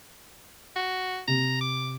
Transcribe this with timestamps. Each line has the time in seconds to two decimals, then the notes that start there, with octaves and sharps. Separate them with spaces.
0.76 F#4
1.28 C3 A#5
1.61 D6